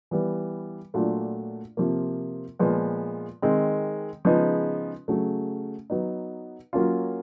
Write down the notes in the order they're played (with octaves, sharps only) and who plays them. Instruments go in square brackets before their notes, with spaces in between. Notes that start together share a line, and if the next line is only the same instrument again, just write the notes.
[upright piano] E3 G3 B3
A#2 F#3 A3 D4 F4
C3 F3 A#3
A#2 F3 G#3 B3
D#3 G#3 C4
C#3 F3 G#3 B3 D#4
C#3 F#3 A3
F#3 B3 D#4
F#3 A#3 C#4 F4